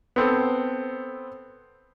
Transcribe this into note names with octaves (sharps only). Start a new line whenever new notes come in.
B3 C4 A4